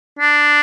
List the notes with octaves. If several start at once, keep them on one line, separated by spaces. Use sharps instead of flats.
D4